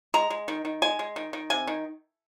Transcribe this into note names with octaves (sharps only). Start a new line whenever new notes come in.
G#3 A#5
G#3
D#3
D#3
G#3 G#5
G#3
D#3
D#3
C3 G#5
D#3